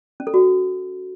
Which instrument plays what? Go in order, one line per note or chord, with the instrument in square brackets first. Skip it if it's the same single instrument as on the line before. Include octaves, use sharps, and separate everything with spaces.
[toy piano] C#4
A4
F#4